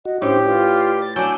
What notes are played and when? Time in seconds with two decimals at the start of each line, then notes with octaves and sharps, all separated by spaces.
0.05 F#4 D#5
0.22 A2 C#4 D4 G4 C5
0.46 F4 B4 D5
1.02 A6
1.16 F#3 D4 G#5 D6 E6 G6